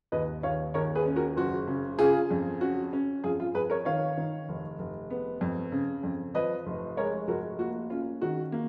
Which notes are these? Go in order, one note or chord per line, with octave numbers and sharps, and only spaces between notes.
D#2 B4 D#5
D#2 C#5 F5
D#2 A#4 C#5
G#4 B4
C#4
F#4 A#4
F#1 F#4
C#3
C#3 F4 G#4
F2
C#4 F#4
C#4
F2 F4 G#4
F4
F2 G#4 B4
A#4 C#5
D#3 C#5 F5
D#3
F1
F1
B3
F2
C#3
F2
F3 B4 D#5
F1
G#3 A#4 C#5
F1 F#4 A#4
A#3 F#4
C#4 F4
D#3 F#4
A#3